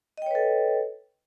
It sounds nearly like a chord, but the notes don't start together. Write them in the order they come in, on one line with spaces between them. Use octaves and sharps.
D#5 G5 C#5 B4 A4